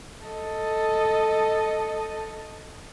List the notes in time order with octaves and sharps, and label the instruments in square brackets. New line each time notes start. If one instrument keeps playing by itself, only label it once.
[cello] A4 D#5